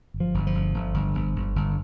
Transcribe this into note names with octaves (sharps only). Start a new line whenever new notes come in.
G1
F3
G1
F3
G1
G1
G1
G1
G1
G1